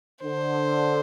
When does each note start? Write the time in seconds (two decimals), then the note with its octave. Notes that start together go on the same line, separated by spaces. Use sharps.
0.24 D3 C5